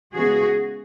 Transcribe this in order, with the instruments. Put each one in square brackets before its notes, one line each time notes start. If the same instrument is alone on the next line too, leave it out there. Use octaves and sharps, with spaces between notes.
[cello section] C#3 E3 G#3 B3 F#4 G#4